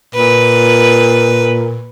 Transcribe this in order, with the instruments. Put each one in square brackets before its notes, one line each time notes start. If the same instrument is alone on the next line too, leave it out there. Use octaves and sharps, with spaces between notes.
[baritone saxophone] A#2 [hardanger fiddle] B4